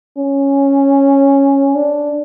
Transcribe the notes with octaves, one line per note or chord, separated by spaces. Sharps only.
C#4
D4